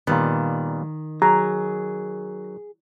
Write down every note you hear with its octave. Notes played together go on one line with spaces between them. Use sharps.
A#2 D#3 G3 B3
F#3 G#4 A#5